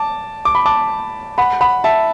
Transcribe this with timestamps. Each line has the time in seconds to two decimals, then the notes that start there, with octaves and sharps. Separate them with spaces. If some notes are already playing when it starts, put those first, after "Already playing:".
Already playing: A5 D6
0.45 D6
0.55 B5
0.66 A5 D6
1.38 F#5 B5
1.61 F#5 B5
1.84 E5 A5